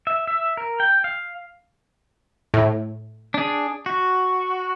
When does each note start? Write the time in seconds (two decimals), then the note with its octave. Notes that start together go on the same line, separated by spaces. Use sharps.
0.07 E5
0.27 E5
0.57 A#4
0.80 G5
1.04 F5
2.54 A2
3.34 D4 G#4
3.86 F#4